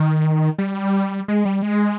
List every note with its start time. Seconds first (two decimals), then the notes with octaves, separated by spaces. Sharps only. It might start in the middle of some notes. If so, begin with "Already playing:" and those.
Already playing: D#3
0.58 G3
1.28 G#3
1.45 G3
1.62 G#3